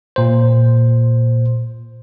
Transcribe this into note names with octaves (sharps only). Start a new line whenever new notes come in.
A#2 C5